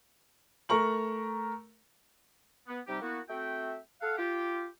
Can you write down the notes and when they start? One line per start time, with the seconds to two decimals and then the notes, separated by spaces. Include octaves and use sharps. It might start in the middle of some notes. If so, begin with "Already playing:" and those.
0.69 A3 A#4 A#5 C#6 F#7
2.68 B3
2.87 C3 G3 D#4 G4
3.01 A#3 B3 E4 F#4
3.29 A3 C4 F#4 E5 G5
4.01 A4 F5 F#5
4.17 F4 G4